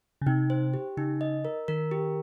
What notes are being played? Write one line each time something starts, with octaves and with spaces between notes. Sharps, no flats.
C#3
C3 D#4
C5
G4
C#3 D#4
D#5
A#4
D#3 A#4
G4